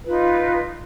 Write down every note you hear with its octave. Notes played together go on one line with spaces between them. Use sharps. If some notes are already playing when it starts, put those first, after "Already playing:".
D#4 F4 B4